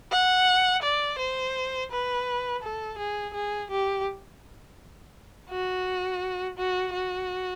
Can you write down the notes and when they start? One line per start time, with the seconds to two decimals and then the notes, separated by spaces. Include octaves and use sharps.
0.12 F#5
0.83 D5
1.19 C5
1.91 B4
2.63 A4
2.98 G#4
3.34 G#4
3.71 G4
5.50 F#4
6.58 F#4
6.93 F#4